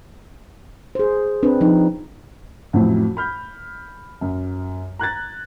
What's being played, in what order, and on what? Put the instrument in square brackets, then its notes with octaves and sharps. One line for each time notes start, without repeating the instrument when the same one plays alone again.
[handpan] G#4 C5
C4 D4 B4
F3 D#4
[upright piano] A1 F2 A2 F3 F#3
B5 F6 G6
F#2
A#5 F#6 G#6 A6